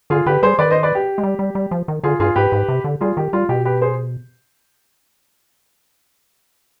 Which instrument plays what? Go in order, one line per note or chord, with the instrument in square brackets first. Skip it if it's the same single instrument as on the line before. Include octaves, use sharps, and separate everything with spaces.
[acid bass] D3 [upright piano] F4 G#4
[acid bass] D3 [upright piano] G4 B4
[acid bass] G3 [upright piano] G#4 C5
[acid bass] D#3 [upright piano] B4 D5
[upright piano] C5 D#5
B4 D5
G4
[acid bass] G#3
G3
G3
G3
F3
D#3
[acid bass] D3 [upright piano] F4 G#4
[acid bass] G2 [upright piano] F4 G#4
[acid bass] G#2 [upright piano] G4 B4
[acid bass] G#2
C3
D3
[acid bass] G3 [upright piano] F4 G#4
[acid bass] D#3 [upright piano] G4
[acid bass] G3 [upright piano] F4
[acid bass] B2 [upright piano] G4
[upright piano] G4 B4
G#4 C5